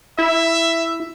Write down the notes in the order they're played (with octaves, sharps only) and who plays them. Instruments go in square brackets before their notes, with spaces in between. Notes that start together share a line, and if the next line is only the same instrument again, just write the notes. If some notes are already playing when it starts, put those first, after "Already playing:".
[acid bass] E4 [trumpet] E5